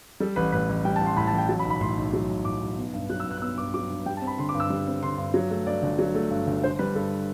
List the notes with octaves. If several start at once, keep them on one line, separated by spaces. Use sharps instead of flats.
G3 A4
A1 B4
A2 B4
A1
G3 G5
A5
A1 C6
A2 B5
A5
A1 G5
F#3 A5
B5
B1
B5
A2 C6
B1
F#3
B1
A2 D6
B1
B3
G2
F#3 F#6
E6
G2 F#6
F#6
B3 E6
G2 D6
F#3 D6
G2
G3 G5
A5
C4
B5
D3 C6
D6
G2
E6
G3
C4
D3 C6
G2
F#3
A3
G2 D5
G1
F#3
A3
G2
G1
D3 C5
G3 B4
G2 A4